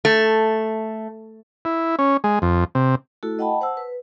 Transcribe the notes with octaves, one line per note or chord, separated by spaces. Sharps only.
A3
E4
C#4
G#3
F2
C3
A3 E4 F#4 A4
D#5 F#5 G5 A5 B5
C5 F#5 A5 E6
B4